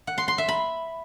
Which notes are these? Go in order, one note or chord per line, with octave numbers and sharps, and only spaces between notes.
F#5
C6
C6
E5
B5